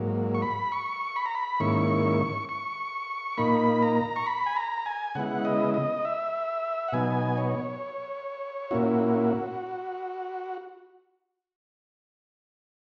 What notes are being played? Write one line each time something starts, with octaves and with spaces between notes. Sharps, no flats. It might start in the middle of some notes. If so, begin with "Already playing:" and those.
Already playing: G#2 F#3 A#3
C#6
B5
C#6
B5
A#5
B5
G#2 D#3 A#3 C#4 E4 C#6
C#6
A#2 A#3 D#4 B5
A#5
C#6
B5
G#5
A#5
G#5
C#3 G#3 B3 E4 F#5
D#5
D#5
E5
F#5
B2 F#3 B3 D#4 G#5
C#5
A#2 A#3 C#4 E4 F#4